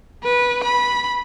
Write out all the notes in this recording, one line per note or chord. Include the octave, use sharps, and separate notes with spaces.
B4
B5